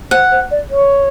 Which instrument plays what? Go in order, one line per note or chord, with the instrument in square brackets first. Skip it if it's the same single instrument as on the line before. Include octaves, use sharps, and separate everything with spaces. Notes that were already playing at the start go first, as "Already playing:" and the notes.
[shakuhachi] C5 [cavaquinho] F#5
[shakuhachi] C5
D5
C#5